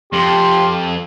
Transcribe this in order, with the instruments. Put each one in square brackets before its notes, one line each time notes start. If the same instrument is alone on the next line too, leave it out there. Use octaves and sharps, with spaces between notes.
[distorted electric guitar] F2 [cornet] G4 [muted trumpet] C6